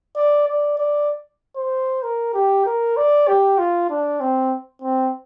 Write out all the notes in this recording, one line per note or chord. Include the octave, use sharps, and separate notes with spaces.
D5
D5
D5
C5
A#4
G4
A#4
D5
G4
F4
D4
C4
C4